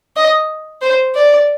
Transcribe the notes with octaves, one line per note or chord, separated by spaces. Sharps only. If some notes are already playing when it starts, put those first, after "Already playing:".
D#5
C5
D5